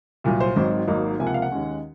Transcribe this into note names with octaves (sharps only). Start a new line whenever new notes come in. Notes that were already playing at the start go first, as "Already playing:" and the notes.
C2 A#2 F#3
C5
G#1 G#2 D#3 F#3 C4
G#1 G#2 F#3 A#3 D#4
C#2 C3 F3 A#3 G#5
F#5
F5
F#5
D#2 D#3 G#3 C#4